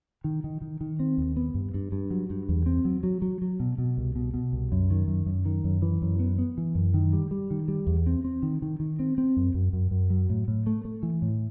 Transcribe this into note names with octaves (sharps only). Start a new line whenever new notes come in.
D#3
D#3
D#3
D#3
C4
D#2
B3
G2
G2
G2
F#3
G2
E2
C4
F#3
F#3
F#3
F#3
B2
B2
C2
B2
B2
C2
F#2
D#3
F#2
F#2
D#3
F#2
E3
F#2
B3
B3
E3
F#2
D#3
G3
G3
D#3
G3
E2
C4
C4
D#3
D#3
D#3
C4
C4
F#2
F#2
F#2
F#2
F#3
A2
A2
A3
A3
E3
A2